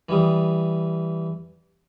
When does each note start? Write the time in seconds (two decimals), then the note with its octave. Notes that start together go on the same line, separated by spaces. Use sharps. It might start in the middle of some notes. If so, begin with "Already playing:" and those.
0.09 E3 G3 D#6